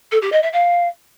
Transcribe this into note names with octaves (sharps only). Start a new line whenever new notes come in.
A4
G4
D#5
E5
F5